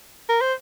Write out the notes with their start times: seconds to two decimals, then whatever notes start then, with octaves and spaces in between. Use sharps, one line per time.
0.29 A#4
0.41 C5